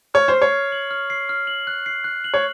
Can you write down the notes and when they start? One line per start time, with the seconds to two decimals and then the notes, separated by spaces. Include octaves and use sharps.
0.14 C#5 F6
0.28 C5
0.34 C7
0.42 C#5
0.52 F6
0.72 F#7
0.91 F6
1.10 C7
1.29 F6
1.47 F#7
1.67 F#6
1.86 C7
2.04 F#6
2.24 F#7
2.34 C#5